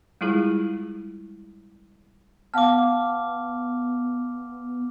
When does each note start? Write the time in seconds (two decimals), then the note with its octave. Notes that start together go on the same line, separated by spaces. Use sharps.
0.21 G3 G#3 E4 F4 G#4
2.54 B3 F5 F#5 A5 D6 F6